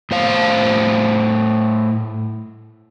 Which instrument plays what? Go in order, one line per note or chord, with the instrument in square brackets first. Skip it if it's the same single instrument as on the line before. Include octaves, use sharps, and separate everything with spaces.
[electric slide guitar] A2 C5 F5